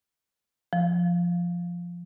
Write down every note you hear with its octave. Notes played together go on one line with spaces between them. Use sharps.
F3